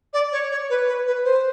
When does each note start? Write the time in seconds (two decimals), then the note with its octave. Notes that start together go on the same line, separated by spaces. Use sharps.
0.13 D5
0.32 C#5
0.51 C#5
0.70 B4
0.87 B4
1.07 B4
1.24 C5